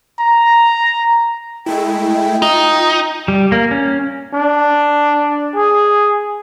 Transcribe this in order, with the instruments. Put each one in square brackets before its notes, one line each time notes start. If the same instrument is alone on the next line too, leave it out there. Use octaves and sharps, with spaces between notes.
[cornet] A#5
[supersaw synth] G#3 A3 E4 [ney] G5
[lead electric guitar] D#4 [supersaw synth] F4
[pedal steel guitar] G3
A#3
C#4
[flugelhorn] D4
G#4